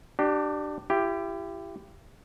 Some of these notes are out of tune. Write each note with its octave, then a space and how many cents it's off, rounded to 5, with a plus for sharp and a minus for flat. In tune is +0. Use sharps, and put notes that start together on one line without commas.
D4 +20 G4 -25
E4 +35 G4 +0